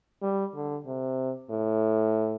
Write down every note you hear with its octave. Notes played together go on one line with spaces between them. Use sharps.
G3
D3
C3
A2